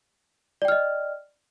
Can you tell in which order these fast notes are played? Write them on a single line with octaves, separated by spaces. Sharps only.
D5 G5 F6 D#5